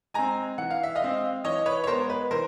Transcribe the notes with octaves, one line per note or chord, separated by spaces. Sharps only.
G#3 C4 G#5 A#5
E3 F#5
F5
E5
D#5 F5
G#3 C4
E3 C#5 D#5
B4 C#5
C#5
G#3 B3 A#4 C5
B4
E3 A#4 C5